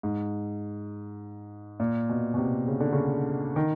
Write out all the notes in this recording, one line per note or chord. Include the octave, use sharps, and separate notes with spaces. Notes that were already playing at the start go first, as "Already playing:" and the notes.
G#2
A#2
B2
B2
C3
C#3
D3
C#3
D#3